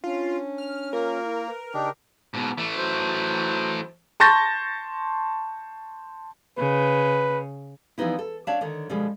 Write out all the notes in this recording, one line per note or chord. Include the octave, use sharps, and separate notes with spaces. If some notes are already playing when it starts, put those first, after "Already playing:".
C#4 D4 F4
F6
A#3 F4 A#4
E4
B4
C#3 D4 D#4 G4
G#2 B2
E3 A3
F#3 C5
A5 C6 C#6 G6 A6 A#6
C#3 B4
E3 F3 G3 B3 D#4 E4
A4
D4 C#5 D5 E5 F5 A5
D3 D#3 C#5
B2 D3 F3 G3 G#3